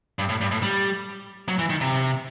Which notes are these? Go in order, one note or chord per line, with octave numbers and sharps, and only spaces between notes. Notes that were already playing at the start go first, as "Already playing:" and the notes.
G2
A2
G2
A2
G3
F#3
E3
D#3
C3